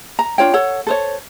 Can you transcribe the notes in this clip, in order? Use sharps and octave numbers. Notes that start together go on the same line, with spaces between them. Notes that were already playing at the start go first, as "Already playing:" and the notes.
A#5
D4 F4 C#5 G5
A4 C#5 F#5
A4 C5 C#5